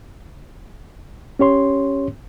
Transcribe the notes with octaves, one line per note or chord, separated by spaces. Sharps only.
C#4 G4 C#5 C6